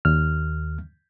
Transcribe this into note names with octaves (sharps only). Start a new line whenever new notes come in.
D#2 F6